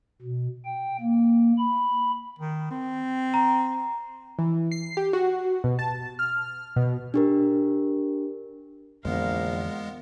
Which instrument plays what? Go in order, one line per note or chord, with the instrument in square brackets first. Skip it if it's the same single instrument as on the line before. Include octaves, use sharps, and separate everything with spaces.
[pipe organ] B2
G5
A#3
B5
[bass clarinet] D#3
C4
[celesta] A#5
[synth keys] E3
C7
G4
F#4
B2
A5
F6
B2
[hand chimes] D4 G4 A#4
[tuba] A#1 [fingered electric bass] F2 D3 E3 [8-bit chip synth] G#3 B3 [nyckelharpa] A#4 F5